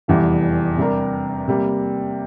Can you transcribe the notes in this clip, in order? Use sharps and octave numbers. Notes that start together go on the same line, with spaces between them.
F1 E2 E3 G3
C3 G3 D4 G4 A#4
C3 G3 A#3